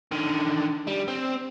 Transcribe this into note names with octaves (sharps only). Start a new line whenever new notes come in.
D3 D#3
G3
C4